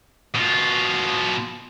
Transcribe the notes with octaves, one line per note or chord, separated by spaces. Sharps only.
B2 F4